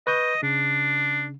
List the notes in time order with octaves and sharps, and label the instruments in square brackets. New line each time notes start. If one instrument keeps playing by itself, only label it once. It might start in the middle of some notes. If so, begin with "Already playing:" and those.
[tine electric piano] B4 C#6 G6 [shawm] D#5
[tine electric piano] C#3 [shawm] D4